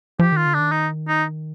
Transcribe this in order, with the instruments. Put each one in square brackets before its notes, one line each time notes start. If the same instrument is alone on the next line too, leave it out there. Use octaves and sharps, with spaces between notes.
[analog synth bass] F3 [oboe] G4
[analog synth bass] D#3 [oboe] F4
[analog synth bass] D3
[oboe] D4
[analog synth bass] D#3
[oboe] D#4
D#4